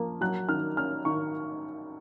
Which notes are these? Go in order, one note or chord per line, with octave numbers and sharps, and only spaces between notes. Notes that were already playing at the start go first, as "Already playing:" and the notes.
Already playing: F3 A#3
F#3 F#6
D#3 F6
C#4 F6
D#3 C#6